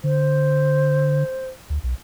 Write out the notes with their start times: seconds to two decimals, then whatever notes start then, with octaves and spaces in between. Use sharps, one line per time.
0.04 D3 C5
1.70 D2
1.84 B1